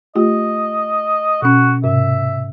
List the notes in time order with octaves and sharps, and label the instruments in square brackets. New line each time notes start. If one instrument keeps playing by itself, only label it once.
[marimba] A3 F4 G4 [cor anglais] D#5
[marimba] B2 C#4 [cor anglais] F#4
[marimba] G#2 C3 [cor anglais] E5